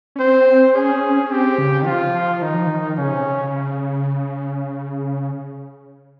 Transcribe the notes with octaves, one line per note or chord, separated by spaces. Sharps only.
C#4
C4 C5
C#4 G#4
C#4
C4 G4
C#3
D#3
F3 F4
F3
D#3 D#4
F3
D#3
C#3 C#4
C3
C#3